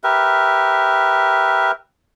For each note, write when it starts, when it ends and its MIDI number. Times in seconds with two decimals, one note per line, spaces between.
0.04 1.71 67
0.04 1.71 70
0.04 1.71 71
0.04 1.71 76